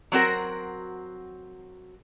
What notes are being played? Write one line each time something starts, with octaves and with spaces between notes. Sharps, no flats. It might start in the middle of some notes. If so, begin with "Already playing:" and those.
F#3 C4 F#4 A#4